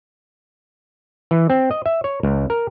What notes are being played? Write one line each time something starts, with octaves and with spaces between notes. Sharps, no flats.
E3
C4
D#5
E5
C#5
C#2
A#4